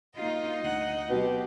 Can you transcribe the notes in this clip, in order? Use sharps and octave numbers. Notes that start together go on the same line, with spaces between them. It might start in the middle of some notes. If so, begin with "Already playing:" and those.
A#3 D#4 F4 D#5
D2 F#5
B2 F#3 C4 G4